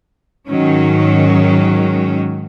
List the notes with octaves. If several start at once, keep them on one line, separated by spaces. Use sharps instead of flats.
G#2 D#3 F#3 C#4